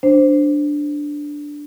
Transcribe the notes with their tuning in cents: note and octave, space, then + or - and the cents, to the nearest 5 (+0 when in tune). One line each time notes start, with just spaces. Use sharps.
D4 +0 C5 +0